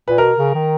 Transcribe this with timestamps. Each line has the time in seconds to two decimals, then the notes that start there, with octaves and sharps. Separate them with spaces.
0.08 A#2 B4
0.18 B2 A#4
0.37 C#3
0.55 D#3